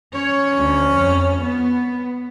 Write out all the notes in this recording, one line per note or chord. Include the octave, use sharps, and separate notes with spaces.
C#4 C#5
D2
F2
B3